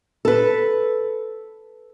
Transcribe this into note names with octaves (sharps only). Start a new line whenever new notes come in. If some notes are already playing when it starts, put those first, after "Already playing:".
A4 B4